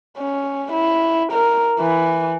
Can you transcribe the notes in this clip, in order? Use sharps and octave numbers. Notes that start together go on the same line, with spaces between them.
C#4
E4
A#4
E3